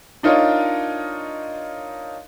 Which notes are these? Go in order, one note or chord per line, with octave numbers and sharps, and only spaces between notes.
D4 D#4 F4 A#4 C#5 D#5